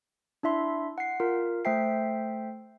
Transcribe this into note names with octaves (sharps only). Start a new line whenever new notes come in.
D4 E4 E5 C6
F#5 C7
F4 A#4
A3 C5 E5 G5 C7